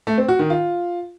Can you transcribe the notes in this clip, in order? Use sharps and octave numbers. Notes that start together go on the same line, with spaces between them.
A3
C4
F#4
D#3
F4